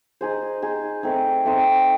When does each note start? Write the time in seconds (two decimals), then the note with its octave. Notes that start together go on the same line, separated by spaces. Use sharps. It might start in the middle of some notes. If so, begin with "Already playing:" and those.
0.21 D#4 G#4 C5
0.62 D#4 G#4 C5
1.03 A3 C4 D#4
1.45 A3 C4 D#4